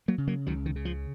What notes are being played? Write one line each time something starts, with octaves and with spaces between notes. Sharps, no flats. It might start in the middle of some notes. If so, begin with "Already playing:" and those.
F#3 A#3
C#3
F#3 A#3
C#2 D#3 F#3
D#3
C#3
F3